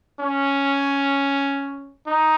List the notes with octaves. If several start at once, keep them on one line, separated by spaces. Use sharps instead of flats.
C#4
D#4